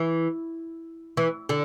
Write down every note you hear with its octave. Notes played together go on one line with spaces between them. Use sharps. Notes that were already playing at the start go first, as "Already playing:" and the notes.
Already playing: E3
E3
D3